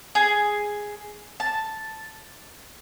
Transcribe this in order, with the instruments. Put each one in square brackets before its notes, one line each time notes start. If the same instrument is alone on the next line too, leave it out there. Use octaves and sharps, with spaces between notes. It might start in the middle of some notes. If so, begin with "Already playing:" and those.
[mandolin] G#4
A5